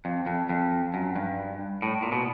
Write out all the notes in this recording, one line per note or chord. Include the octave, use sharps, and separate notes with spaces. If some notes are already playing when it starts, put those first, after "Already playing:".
F2
F2
F2
F#2
G2
A2
A#2
B2